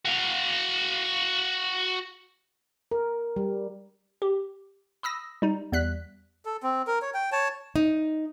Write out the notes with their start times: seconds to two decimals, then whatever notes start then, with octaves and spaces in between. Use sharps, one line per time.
0.05 F#4 F5
2.91 A#4
3.36 G3
4.22 G4
5.03 B5 D#6 E6 A#6
5.42 G3 D#4
5.72 E2 G3 F#6 B6
6.45 A4
6.63 C4
6.87 A#4
7.02 C#5
7.14 G5
7.32 C#5 A5
7.76 D#4